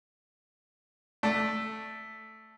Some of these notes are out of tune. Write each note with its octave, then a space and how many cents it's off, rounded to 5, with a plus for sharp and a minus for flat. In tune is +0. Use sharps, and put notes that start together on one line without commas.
A3 +0 D5 +0